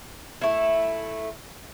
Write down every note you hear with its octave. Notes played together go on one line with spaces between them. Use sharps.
A3 E4